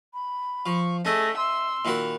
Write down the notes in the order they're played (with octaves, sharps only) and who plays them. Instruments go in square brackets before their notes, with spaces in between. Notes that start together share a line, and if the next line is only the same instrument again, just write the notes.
[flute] B5
[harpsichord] F3 [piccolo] C#6
[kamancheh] A3 [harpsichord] C#4 D#5 [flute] G#4 [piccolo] A#6
[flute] E5 [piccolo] C6 [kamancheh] E6
[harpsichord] A#2 D#3 F#4 [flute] B5